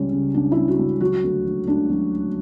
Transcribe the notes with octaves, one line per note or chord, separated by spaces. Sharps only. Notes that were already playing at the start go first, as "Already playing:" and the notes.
Already playing: C#2 G3 C#4
C#3
C#2 D4
G3 E4
F#4
C#2
F#3 F#4
D2
D3
D2 D4
F#3